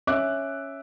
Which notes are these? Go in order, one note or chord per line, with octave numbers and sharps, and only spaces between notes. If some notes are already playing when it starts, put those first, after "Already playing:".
C#4 E5 D6 F#6